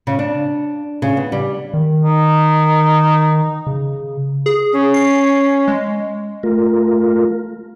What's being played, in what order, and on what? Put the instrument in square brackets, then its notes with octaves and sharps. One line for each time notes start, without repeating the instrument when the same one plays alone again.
[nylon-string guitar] C#3
D4
C#3
B3
G3
[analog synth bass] D#3
[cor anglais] D#4
[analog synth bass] C#3
[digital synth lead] G#4
[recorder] C#4
[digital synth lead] C7
G#3
[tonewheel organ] A3 F4 A#4